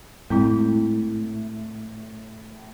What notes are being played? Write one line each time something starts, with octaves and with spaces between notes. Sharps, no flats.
A2 G#3 C4 E4